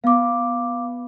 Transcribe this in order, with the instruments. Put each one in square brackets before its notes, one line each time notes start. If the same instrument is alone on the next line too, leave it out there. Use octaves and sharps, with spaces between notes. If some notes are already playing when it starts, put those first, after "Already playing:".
[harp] B3 [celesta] F5 D6